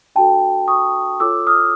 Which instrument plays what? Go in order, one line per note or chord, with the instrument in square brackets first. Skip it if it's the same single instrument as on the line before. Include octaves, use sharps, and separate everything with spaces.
[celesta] D4 F#4 A4 G5 A5
C#6 D#6
F4 A4 C#5 D6 E6
D#6 F6